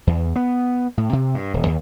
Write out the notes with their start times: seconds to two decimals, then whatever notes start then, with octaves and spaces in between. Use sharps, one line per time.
0.07 E2
0.36 B3
0.97 A2
1.13 C3
1.34 G2
1.54 D#1
1.66 D#2